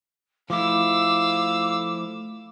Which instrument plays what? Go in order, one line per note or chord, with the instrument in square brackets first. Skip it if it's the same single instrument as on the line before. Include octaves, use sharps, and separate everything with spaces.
[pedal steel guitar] F3 A3 E4 [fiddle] F5 E6 [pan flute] D6